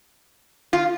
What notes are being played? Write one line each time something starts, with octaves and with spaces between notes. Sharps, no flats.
F4